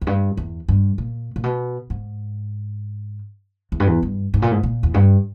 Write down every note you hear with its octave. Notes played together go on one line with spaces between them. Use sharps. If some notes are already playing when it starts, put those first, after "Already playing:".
E2
G2
E2
G2
A#2
A#2
B2
G#2
E2
G2
E2
G2
G#2
A#2
G#2
A#2
E2
G2